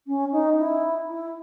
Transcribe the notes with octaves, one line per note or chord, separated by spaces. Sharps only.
C#4
D#4
E4
E4